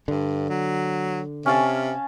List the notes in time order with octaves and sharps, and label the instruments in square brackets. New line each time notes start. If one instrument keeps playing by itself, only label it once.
[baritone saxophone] G2 [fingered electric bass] D3
[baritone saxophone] F#3
[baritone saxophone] C3 [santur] C#4 F5 A5